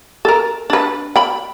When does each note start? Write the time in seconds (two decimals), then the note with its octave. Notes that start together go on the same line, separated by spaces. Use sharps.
0.25 A4 A#4
0.70 D4 B4
1.16 G5 B5